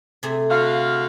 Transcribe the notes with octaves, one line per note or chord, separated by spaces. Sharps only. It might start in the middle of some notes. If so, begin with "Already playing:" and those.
C3 A3 G#4
D3 F#4 F5